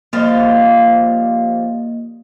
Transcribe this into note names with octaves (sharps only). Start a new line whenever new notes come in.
F3 G3 A#3 F4 D#5